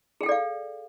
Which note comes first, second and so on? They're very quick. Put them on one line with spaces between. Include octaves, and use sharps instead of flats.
G#4 G5 A4 D5 F5